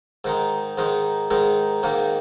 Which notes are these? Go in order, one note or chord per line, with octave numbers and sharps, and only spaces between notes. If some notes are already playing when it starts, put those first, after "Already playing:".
G#2 D#3 G#3 D#4
G#2 D#3 G#3 D#4
G#2 D#3 G#3 D#4
G#2 D#3 A#3